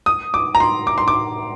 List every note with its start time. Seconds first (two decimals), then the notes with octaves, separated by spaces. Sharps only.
0.06 D#6
0.34 D6
0.55 A#5
0.60 C6
0.87 D6
0.98 C6
1.08 D6